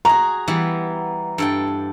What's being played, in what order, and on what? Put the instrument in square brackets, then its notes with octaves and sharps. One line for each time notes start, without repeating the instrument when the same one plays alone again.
[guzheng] F#4 G#4 [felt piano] A#5
[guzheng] E3 G3 B3
G2 A4 G5